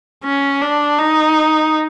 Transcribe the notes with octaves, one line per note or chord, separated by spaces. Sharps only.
C#4
D4
D#4